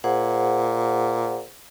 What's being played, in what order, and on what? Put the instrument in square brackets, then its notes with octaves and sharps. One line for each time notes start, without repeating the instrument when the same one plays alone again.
[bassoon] A#2 [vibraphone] G#4 C5 F#5